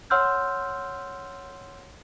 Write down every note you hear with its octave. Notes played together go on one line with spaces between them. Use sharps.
C#5 F#5 C6 E6 F6 G6